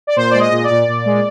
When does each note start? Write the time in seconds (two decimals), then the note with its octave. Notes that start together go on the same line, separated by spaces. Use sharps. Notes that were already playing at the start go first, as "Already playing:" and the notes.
0.07 D5
0.16 A#2 C5
0.31 D5
0.34 G#3
0.39 D#5
0.51 A#2
0.64 D5
0.70 A#2
0.88 A#2
1.06 G#3